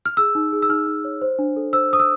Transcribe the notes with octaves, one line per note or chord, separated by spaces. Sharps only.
F6
G#4 E6
D#4
G#4
E6
D#4 F6
D#4
C#5
C5
D4
A4
C5 E6
C5 D#6
E6